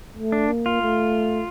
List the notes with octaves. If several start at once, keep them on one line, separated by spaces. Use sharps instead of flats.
A3
D4
A#3
F4
A3